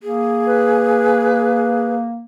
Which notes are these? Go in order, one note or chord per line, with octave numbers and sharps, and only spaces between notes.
A#3 G#4
B4